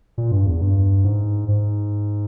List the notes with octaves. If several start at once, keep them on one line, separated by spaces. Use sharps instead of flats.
A#2
G2
E2
G2
G#2
G#2